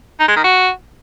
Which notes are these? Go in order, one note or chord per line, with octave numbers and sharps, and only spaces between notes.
D#4
G#3
D#3
F#4